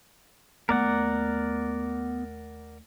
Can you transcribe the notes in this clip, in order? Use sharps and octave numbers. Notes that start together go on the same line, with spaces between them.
D#2 A3 B3 A#4 D5 F#5